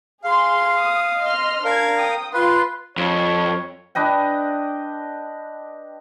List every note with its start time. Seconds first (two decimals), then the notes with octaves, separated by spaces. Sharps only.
0.24 G#4 F5 C6
0.79 D#6
1.20 D#5 C6 F6
1.64 D4 A#4 F5 G#6
1.98 G5 D#6
2.34 F4 B4 C6
2.98 F2 C#5
3.95 D4 B4 D#5 G5